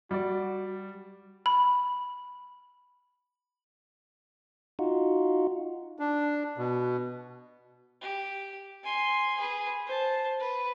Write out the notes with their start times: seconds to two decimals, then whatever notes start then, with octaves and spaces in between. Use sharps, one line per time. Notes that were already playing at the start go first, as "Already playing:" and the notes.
0.11 G3 F#4 D5
1.46 B5
4.79 D#4 F4 F#4
5.99 D4
6.58 B2
8.01 G4
8.83 G#5 C6
9.37 G#4 B4
9.86 C5 A5
10.40 B4